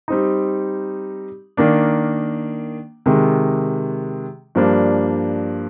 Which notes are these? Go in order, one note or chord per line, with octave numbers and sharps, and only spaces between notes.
G3 C4 D#4
D#3 A#3 D4
C3 D#3 G#3
G2 F3 A#3 D4